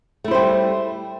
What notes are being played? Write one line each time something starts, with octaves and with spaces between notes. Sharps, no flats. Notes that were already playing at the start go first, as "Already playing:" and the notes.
G3 A3 E4 C5